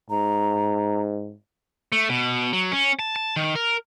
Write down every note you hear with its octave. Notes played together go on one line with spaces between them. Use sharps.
G#2 A#5
A3
B2
F#3
C#4
A5
A5
D#3
A#4